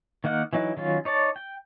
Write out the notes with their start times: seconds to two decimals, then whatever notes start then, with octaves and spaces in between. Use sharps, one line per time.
0.24 D#3 A#3 D#4 F#5 F6
0.53 E3 F#3 D#4 E4
0.77 D#3 F#3 C#4 F4
1.05 D#4 C#5 D5 A5
1.36 G5